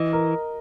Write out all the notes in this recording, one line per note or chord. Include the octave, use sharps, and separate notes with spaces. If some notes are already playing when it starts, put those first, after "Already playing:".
Already playing: E3 D#5
A#4